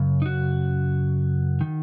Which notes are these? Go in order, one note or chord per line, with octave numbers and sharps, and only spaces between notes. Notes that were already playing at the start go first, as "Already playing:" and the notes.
Already playing: F#2 C#3
D#4
F#4
D#3